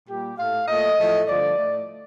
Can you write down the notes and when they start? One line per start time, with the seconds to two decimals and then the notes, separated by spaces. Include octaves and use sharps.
0.09 A#2 G3 A#3 G4
0.38 A2 A3 F5
0.68 A#2 A3 D#5
0.98 A2 F3 A3
1.28 G2 D3 F3 A3 D5
1.58 A2 A3